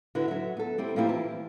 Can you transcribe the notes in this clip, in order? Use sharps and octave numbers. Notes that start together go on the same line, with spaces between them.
D3 E4 F#4 B4
F#3 E5
B3 A4
G3 C4 E4
F3 A#3 C4 E4 G4
E3 A5